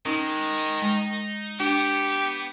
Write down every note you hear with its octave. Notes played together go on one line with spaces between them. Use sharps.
D#3 G#3 C#4 D#4
G#3 D#4
B3 D4 G4